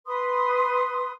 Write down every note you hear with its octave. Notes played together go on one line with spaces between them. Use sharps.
B4 C6 D#6